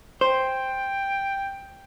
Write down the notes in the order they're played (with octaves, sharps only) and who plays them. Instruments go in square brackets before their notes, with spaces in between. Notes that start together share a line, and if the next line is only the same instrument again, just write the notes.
[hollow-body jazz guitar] C5 [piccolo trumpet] G5